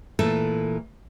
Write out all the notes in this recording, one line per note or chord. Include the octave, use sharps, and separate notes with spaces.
A#2 E3 A3 A4